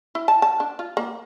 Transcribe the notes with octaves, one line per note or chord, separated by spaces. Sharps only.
E4
A5
A5
D4
F4
A#3